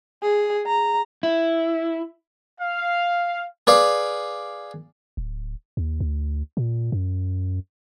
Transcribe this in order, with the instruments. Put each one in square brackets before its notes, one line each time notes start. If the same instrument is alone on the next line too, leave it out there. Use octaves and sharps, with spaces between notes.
[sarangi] G#4
A#5
[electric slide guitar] E4
[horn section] F5
[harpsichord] G#4 B4 D5 F5
[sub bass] D1
D#2
D2
A#2
F#2